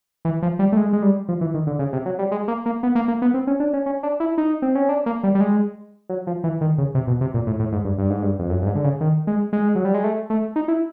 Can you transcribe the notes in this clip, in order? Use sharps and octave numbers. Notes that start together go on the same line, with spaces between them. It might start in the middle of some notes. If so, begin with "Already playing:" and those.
E3
F3
G3
A3
G#3
G#3
G3
F3
E3
D#3
D3
C#3
C3
F#3
G3
G#3
A#3
A#3
B3
A#3
A#3
B3
C4
C#4
D4
C#4
C#4
D4
E4
D#4
C4
C#4
D4
A#3
G3
G3
G#3
F#3
F3
E3
D#3
C#3
C3
B2
C3
A#2
A2
A2
G#2
G2
G2
G#2
G2
F2
F#2
G2
G#2
D3
C#3
D#3
G#3
G#3
F#3
G3
G#3
A3
A3
D#4
E4